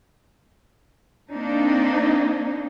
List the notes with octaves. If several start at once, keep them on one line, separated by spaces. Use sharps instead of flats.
A#3 C4 D4 D#4